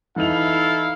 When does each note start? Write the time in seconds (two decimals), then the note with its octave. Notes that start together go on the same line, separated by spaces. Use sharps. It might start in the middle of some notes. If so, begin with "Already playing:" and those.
0.16 E3 D#4 E4 A4 F5 F7